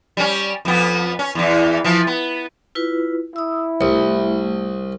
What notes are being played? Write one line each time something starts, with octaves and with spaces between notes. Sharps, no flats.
G3 C#4
F2 B3
C#4
E2 E3
E3 F3
B3
E4 F4 B4
E4 D#6 E6
C2 A3